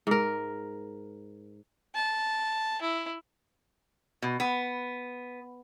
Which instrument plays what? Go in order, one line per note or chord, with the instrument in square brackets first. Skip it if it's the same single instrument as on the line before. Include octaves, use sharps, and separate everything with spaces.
[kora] G#2 A#4
[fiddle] A5
E4
[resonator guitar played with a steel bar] B2
B3